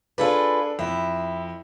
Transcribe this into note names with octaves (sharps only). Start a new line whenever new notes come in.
D4 F4 G#4 A4 B4
F2 E4